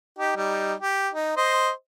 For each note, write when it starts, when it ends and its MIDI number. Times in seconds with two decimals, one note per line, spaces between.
0.18 0.34 63
0.18 0.34 67
0.36 0.74 55
0.36 0.74 63
0.80 1.09 67
1.14 1.35 63
1.37 1.70 72
1.37 1.70 75